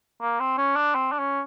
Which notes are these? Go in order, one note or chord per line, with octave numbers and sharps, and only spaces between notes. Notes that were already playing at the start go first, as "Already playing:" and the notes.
A#3
C4
C#4
D4
C4
D4
C#4